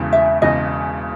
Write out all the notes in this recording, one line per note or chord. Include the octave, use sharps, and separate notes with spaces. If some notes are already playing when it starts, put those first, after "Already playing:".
Already playing: E1 E2 C#3
E5
E1 E2 C#3 D#5